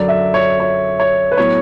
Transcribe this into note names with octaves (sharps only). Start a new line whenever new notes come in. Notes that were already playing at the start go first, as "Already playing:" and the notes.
Already playing: F#2 D3 F#3 D5
E5
C#5
C#5
C#5
B4
A2 F#3 B3 C#5